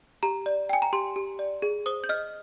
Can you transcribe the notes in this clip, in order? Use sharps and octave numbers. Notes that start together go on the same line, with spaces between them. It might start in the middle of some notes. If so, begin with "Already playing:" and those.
G4 A#5
D5
G5 G#5
A#5
G4 C6
G4
D5
G#4
C5 D#6
G6
D#5 F6